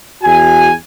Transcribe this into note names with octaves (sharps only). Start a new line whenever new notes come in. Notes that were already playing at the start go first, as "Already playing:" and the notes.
E2 F#4 G#5